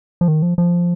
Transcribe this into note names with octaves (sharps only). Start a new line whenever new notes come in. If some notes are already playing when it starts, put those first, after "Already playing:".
F3
D#3
F3
F3